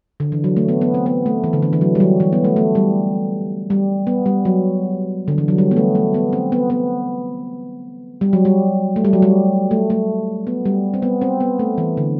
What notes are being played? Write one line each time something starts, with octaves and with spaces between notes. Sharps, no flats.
D3
E3
F#3
A3
B3
B3
C4
B3
A3
E3
D3
E3
E3
F#3
G3
F#3
E3
B3
A3
A3
G3
G3
B3
G3
F#3
D3
E3
F#3
G3
B3
A3
A3
B3
C4
B3
B3
G3
F#3
G3
A3
G3
F#3
G3
A3
A3
B3
G3
C4
B3
C4
B3
A3
E3
D3